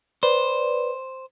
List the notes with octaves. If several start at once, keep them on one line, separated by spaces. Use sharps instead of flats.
B4 C5 D5